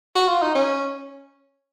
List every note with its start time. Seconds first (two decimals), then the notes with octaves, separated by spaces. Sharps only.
0.15 F#4
0.28 F4
0.42 D#4
0.55 C#4